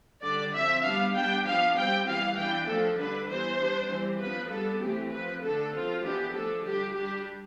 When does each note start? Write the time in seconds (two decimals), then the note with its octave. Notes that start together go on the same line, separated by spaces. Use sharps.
0.22 D3 G3 D4 D5
0.53 F3 C4 E5
0.83 G3 B3 D4 F5
1.14 G3 B3 D4 G5
1.44 F3 B3 D4 F5
1.75 G3 C4 G5
2.05 E3 G3 B3 F5
2.36 E3 B3 D4 G5
2.67 F3 A3 D4 A4
2.97 D3 G3 D4 B4
3.28 E3 G3 B3 C5
3.59 G3 B3 D4
3.89 E3 G3 C4
4.20 F3 B3 D4 B4
4.50 G3 B3 D4 A4
4.81 E3 A3 C4 G4
5.12 F3 C4 B4
5.42 D3 A3 D4 A4
5.73 F3 C4 F4
6.03 E3 B3 D4 G4
6.33 D3 F3 A3 D4 A4
6.64 G3 D4 G4
6.95 G3 D4 G4